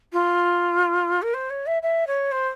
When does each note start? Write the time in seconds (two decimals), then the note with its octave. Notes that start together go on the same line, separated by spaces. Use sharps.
0.13 F4
1.22 A#4
1.34 C5
1.50 C#5
1.66 E5
1.82 E5
2.07 C#5
2.32 C5